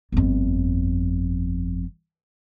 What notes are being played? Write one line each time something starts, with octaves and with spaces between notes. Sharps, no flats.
G1 F2